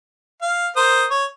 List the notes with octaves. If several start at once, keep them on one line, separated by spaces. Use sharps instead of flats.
F5
A#4 C5 D#6
C#5